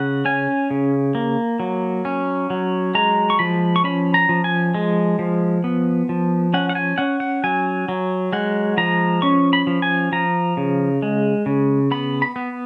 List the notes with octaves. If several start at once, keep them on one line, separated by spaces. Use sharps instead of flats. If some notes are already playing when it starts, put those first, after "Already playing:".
Already playing: C#3 F#5
C#4 G#5
C#3
A#3
F#3
C#4
F#3
G#3 A#5
C#6
F3 B5
C#6
C#4 B5
A#5
F3
G#5
G#3
F3
B3
F3
C#4 F#5
F#5
G#5
C#4 F#5
F#5
F#3 G#5
F#3
G#3 F#5
F3 A#5
C#4 C#6
B5
F3
G#5
F3 A#5
C#3
G#3
C#3
B3 B5
B5
B3